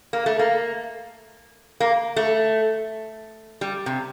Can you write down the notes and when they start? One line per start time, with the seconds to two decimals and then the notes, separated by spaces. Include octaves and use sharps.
0.13 A#3
0.26 A3
0.39 A#3
1.80 A#3
2.16 A3
3.61 G3
3.86 C3